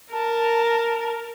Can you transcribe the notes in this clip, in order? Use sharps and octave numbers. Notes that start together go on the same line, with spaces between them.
A#4 A5